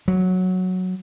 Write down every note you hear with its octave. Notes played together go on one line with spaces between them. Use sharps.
F#3